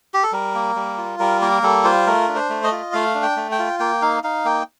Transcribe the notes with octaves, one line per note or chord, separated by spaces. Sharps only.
G4
A4
G3 A#4
A#3
G3
F4
G3 A#4
A#3 A#4
G3 A4
F4 C5
A3 A#4
D4
C5
A3
D#5
F4
A3 F5
D4
G5
A3
G5
F4
A#3 G5
D#4 F5
D#4 F5
A#3 G5